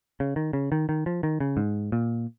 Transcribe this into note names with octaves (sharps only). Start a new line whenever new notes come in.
C#3
D#3
C#3
D#3
D#3
F3
D#3
C#3
G#2
A#2